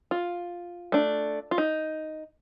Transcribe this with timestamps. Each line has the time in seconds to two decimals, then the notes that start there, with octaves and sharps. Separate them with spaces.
0.11 F4
0.92 A3 D4
1.51 F4
1.58 D#4